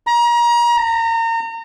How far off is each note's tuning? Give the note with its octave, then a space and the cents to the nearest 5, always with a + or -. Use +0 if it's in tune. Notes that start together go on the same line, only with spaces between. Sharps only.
A#5 +35
A#5 -35